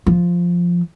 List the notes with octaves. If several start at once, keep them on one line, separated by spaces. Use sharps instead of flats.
F3